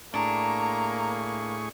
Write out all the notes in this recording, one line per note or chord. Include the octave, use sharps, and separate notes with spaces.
A2 A#3 D4 G#4 A#5 C#6